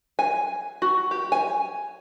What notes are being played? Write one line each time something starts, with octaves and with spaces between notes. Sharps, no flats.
G#5
F#4
G4
G#5